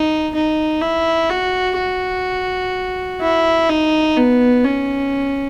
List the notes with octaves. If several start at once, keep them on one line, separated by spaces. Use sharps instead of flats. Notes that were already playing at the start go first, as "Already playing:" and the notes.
Already playing: D#4
D#4
E4
F#4
F#4
E4
D#4
B3
C#4